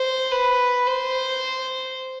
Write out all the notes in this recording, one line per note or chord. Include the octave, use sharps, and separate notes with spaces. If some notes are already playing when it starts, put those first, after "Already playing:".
Already playing: C5
B4
C5